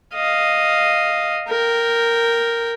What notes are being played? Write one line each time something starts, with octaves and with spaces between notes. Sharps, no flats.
D#5 F5
A#4 G5